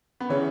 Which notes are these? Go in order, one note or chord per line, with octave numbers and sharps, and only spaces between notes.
B3
C#3 E3 C#4